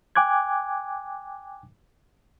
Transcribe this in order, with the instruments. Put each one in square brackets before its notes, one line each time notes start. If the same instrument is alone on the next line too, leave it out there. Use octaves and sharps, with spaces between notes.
[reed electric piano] G5 G#5 D6 F#6 G#6